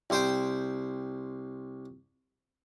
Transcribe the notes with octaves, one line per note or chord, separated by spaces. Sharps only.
C2 C5 G5